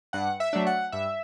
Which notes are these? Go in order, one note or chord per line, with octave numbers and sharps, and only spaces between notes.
G2 F#5
E5
F#3 A3 D4
F#5
G2 E5